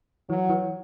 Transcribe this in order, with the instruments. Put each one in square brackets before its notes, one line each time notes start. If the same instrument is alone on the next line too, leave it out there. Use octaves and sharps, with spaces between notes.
[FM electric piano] E3 [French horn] F#3
[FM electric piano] E3